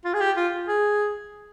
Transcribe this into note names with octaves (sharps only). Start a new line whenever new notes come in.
F4
G#4
G4
F4
G#4